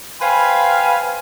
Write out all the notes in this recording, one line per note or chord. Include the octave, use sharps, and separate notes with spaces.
B4 C5 F5 G5 G#5 B5